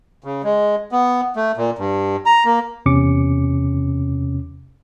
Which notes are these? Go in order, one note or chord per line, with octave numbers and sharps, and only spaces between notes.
C#3
G#3
B3
A3
A#2
G2
A#5
A#3
E2 C3 C#4 D6 C#7